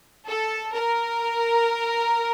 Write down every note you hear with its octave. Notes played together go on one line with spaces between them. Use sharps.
A4
A#4